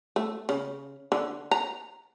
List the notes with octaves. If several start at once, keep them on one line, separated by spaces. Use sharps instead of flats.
A3
C#3
D3
A#5